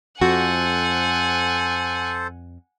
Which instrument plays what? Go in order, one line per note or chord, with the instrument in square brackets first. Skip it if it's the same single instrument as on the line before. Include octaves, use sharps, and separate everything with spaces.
[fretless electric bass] F2 [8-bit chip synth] F#4 [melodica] A4 C5 [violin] F#5 G#5